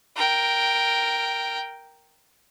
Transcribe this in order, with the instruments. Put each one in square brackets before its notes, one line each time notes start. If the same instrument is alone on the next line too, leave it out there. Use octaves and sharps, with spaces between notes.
[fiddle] A#4 G5